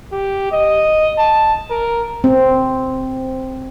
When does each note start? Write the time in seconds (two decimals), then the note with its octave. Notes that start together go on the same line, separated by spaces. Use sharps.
0.12 G4
0.52 D#5
1.19 A5
1.71 A#4
2.24 C4